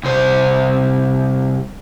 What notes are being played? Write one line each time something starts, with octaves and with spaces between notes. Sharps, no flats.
C2 C5